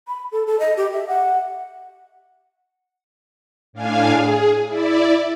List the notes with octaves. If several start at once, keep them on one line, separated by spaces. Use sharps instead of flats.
B5
A4
A4
D#5
G4
E5
F#5
A2 D4 F5 G#5
G#4
E4 D5